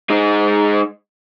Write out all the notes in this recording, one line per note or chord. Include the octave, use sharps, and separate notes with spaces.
G#3 D#4